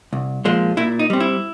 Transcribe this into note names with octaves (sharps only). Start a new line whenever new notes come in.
C2
A#2 F3 G#3
A#2 E4
D#4
G3 C4
E4